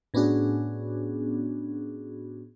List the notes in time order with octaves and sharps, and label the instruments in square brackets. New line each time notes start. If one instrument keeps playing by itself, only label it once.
[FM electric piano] A2 B3 C#4 D4 F#4 G#4